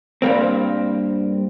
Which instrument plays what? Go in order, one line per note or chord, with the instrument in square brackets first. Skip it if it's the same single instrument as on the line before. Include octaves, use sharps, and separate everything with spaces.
[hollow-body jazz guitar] G2 G3 A#3 C4